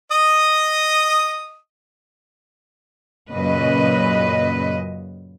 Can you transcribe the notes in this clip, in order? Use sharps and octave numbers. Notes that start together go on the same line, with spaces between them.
D#5 D#6
F#2 A#2 C#3 B4 D#5